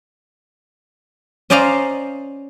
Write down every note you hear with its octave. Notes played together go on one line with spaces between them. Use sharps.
C#4 C5 D5 D#5 F5 A#5